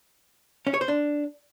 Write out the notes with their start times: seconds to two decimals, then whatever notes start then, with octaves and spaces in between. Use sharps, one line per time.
0.67 C#4
0.74 C#5
0.81 C5
0.88 D4